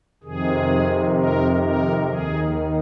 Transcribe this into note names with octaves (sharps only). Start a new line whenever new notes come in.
F2 C3 D#3 G#4
A#4
A#4
D#2 D#3 G#4